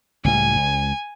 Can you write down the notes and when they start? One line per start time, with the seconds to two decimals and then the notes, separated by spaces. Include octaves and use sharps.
0.25 C#2 A2 G3 G#5
0.55 C#2